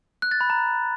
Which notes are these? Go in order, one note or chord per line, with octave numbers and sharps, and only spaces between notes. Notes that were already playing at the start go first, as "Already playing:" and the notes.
F#6
A6
B5
A#5